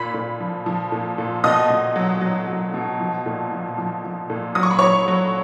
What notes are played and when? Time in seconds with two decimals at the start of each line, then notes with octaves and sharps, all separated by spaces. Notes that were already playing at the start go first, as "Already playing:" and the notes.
Already playing: A#2 B5 B6
0.14 A#2
0.40 F3
0.66 F3
0.92 A#2
1.18 A#2
1.44 B2 D#5 D#6
1.70 B2
1.96 F#3
2.21 F#3
2.48 F#3
2.74 B2
3.00 F3
3.26 A#2
3.52 F3
3.78 F3
4.04 F3
4.30 A#2
4.55 F#3 D#6
4.63 C#6
4.71 B5
4.79 F#3 C#5 C#6
5.08 F#3